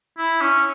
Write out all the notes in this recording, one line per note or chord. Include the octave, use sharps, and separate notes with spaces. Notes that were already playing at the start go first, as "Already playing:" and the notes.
E4
C#4